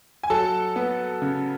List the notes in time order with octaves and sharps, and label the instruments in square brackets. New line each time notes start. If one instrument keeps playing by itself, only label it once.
[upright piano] G#5
F#3 A4 A5
B3
C#3